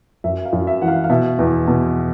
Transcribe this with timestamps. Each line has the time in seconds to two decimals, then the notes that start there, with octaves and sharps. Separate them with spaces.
0.24 F#2 E5
0.45 F5
0.53 F#2
0.67 E5
0.81 E3 F#5
0.88 F5
1.04 F5
1.10 B2 E5
1.39 E2
1.67 B2